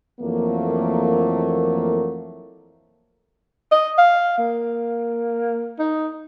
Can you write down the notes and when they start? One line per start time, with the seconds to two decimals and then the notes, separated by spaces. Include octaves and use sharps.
0.20 F2 E3 F#3 A3 A#3
3.72 D#5
3.98 F5
4.39 A#3
5.79 D#4